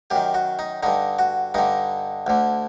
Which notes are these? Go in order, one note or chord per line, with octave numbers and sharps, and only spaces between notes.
F#2 D#3 G4
F#4
D#4
G2 D3 D#4
F#4
G2 D3 D#4
D2 D3